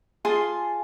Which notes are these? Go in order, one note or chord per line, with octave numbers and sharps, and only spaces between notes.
F4 G#4 A5 C6